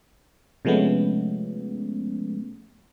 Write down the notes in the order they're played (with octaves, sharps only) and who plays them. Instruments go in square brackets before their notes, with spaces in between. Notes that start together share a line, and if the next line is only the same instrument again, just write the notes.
[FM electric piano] C3 F3 G#3 A3 B3 C#4